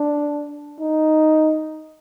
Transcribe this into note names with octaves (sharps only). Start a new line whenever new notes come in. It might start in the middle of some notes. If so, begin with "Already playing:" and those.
Already playing: D4
D#4